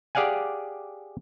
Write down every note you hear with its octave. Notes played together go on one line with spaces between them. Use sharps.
G4 G#4 D5 F5 F#5 G#5